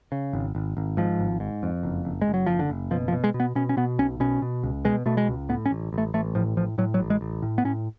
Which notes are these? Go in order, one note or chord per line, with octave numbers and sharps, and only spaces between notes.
C#3
G#1
G#1
G#1
G#2 F3
G#1
G#2
F2
F#1
F#1
G#3
F#1
F#3
F#1 F3
D3
F#1
B2 F3
F3
B2
G#3
B2
B3
B2 C#4
C#4
B2 B3
B1 C#4
B2 C#4
B2
C#2
B2 G#3
B2 A3
G#3
C#2
A2 B3
C#4
A1
A1
A3
A1 A3
A2 F3
A2 F3
A2 F#3
F#3
A1
G#3
A1
A2
B3
A2 C#4